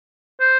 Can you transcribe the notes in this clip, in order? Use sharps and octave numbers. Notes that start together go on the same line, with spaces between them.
C5